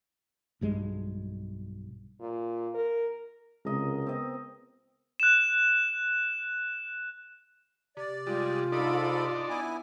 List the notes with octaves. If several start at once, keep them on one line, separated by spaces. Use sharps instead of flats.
B1 G2 G#3
A#2
A#4
C#2 C3 G#3 A#4 D#5
B3 C4 D#5
F#6 E7
C3 D5
G3 G#3 F4
G#2 D4 D#4 A4 D5 B5
B3 E4 G#5